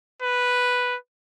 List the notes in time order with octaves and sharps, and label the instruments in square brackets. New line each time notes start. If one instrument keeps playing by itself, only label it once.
[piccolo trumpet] B4